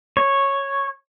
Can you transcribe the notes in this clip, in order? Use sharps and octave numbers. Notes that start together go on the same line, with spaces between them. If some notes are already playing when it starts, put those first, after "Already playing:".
C#5